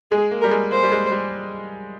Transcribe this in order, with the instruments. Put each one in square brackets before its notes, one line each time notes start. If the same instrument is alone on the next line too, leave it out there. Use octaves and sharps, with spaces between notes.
[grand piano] G#3 [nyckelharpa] G#4
[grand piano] A#3
[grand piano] G3 [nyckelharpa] A#4
[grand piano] G#3
[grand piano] A#3 [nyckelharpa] C5
[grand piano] G3
G#3
G3